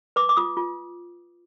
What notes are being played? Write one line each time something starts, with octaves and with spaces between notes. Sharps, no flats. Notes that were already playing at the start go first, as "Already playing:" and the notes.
B4 D6
D6
F4 D#6
F4